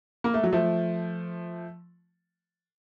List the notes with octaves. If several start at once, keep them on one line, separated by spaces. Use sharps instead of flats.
A#3
A3
F#3
F3 A3